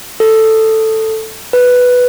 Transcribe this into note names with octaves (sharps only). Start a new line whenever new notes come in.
A4
B4